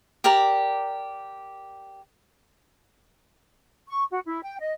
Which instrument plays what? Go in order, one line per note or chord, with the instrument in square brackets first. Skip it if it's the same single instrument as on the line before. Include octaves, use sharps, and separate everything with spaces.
[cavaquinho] G4 A#4 D5 A#5
[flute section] C#6
F#4
E4
G5
D#5